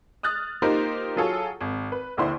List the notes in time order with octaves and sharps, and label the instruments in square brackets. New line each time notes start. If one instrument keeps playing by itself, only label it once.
[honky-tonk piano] D#6 F6 F#6 A6
A#3 D#4 F4 G4 A#4 C5
F#3 F4 G#4 A4 C#5
G#1
B4
A#1 D#2 D3 E4 C5 C6